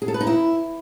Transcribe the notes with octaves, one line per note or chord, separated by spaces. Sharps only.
G#4
A4
B4
D#4
E4